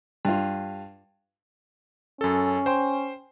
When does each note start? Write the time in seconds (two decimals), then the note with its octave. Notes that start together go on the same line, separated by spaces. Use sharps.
0.25 G2 F4
2.21 F#2 C#4 A4
2.66 C5 G5 C6